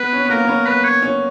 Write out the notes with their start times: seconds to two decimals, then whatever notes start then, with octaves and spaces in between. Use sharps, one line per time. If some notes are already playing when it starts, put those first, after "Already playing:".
Already playing: B3 B4
0.13 C#4
0.25 B3
0.30 A#3 A#4
0.44 C#4
0.48 B3
0.66 B3 B4
0.84 C#5
1.02 C#4